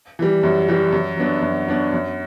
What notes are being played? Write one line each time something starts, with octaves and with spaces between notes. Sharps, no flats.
E3 G3
F#2
E3 G3
F#2
F#3 B3 D4
F#2
F#3 B3 D4
F#2